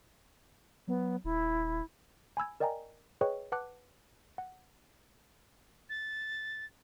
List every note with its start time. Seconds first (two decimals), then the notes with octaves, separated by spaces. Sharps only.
0.88 F#3 B3
1.24 D#1 E4
2.37 G#5 B5 E6 G#6
2.60 A#4 D5 D#5 G5 G#5 A#5
3.21 G#4 B4 C#5 D#5 G5 C#6
3.52 B4 F#5 A5 D6 F#6
4.38 F#5
5.90 A6